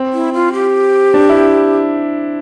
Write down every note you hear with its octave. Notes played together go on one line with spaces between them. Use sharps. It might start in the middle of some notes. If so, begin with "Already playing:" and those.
Already playing: C4
E4
F4
G4
D4
E4